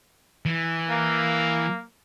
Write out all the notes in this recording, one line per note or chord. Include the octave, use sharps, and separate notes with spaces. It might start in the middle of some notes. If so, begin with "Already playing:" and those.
E3
A#3